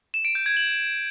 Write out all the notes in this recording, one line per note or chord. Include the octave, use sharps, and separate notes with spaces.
E7
D7
G6
G#6
F#7